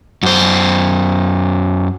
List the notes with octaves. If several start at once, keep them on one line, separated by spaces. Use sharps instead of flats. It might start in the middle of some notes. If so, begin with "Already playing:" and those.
F#2 C5